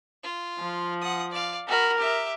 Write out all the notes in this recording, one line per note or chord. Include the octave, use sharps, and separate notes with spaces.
F4
F3
F#5 D#6
D5 F5
F#4 A#4 B5
G4 E5